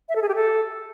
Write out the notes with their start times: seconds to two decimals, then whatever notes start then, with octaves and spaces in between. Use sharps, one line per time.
0.09 E5
0.15 A4
0.22 G#4
0.29 G4
0.35 A4